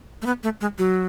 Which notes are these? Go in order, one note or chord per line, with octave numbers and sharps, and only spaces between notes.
A3
B3
A3
G#3
F#3